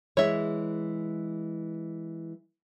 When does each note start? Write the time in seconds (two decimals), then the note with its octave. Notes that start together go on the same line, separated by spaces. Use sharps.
0.17 E3 G#3 C#5 E5